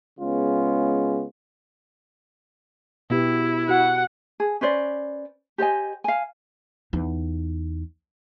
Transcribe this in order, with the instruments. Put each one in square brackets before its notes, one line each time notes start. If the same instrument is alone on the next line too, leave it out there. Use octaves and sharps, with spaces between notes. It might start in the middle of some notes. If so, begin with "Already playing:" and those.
[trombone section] C#3 G#3 B3 C#4 F4
[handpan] B2 B3 G4 [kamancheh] E4
[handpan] F#4 [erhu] F#5
[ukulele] G#4
C#4 B4 C5 D5
G4 C5 D#5 G#5
F5 G#5
[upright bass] E2 D#4